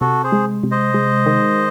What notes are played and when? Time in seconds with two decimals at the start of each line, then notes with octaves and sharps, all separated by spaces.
0.01 C3 F#4 A4
0.24 G#4 C5
0.32 G#3
0.63 C3
0.71 C5 D#5
0.94 G#3
1.26 D#3